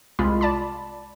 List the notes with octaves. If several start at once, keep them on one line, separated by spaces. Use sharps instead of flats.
C2 G#3 F4 B5
D5 A5 B5